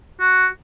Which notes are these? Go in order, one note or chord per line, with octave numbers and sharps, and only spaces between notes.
F#4